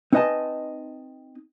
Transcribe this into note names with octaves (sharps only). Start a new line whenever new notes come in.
C4 D#4 B4 D#5 G#5 A5